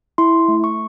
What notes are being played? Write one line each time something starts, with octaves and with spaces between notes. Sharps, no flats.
E4 C6
A3
C#6